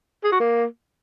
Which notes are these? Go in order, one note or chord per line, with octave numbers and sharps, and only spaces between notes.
G#4
F#4
A#3